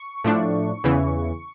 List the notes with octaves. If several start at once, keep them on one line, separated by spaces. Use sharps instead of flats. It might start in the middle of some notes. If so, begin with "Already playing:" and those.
Already playing: C#6
A2 F3 A3 D4
E2 C#3 E3